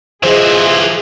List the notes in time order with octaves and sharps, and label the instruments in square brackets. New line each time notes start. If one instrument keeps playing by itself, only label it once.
[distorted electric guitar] E3 F4 [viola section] G#4 [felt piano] C5 D#5